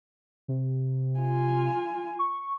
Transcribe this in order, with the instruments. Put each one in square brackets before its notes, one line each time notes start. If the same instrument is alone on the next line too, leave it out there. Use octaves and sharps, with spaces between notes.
[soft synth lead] C3
[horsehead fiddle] F4 G#5
[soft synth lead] C#6